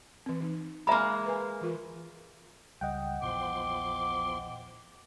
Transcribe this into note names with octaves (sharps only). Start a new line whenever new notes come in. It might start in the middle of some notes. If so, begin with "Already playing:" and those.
E3 C4
E3 D#4
G#3 A#3 E5 A#5 B5
B4 G#5
E3 F4 A#4
C#2 G3 D#5 F#5 G5
A#1 E2 F3 C6 D6